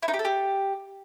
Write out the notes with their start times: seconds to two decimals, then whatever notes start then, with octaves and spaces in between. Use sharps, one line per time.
0.03 E4
0.08 D#4
0.14 G4
0.19 A4
0.25 G4